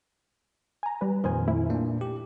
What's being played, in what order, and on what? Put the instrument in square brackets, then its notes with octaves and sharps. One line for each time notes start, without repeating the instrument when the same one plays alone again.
[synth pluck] G#5 A#5
G3 B4
[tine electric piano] F2 A#2 D#3 [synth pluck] B4 C5 G#5
[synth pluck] A3 E4
[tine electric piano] A#2 A#3 D4
G4